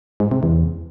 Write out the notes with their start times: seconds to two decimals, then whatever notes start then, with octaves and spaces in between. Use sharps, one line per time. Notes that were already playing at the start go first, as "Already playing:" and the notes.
0.20 G#2
0.31 C3
0.43 E2